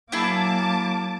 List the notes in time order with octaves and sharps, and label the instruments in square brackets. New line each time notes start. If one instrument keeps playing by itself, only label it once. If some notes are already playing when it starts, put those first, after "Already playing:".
[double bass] F#3 A#3 [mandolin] E4 G#4 [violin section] A5 D6